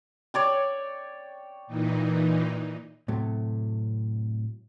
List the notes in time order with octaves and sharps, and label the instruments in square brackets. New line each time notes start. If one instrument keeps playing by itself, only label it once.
[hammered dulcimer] C#5 D5 G5
[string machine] A#2 E3 D#4
[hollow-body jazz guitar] A2 C3 F#3 A3